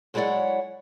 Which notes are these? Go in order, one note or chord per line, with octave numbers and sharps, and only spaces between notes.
F#3 G#3 E4 C#5 D5 F#5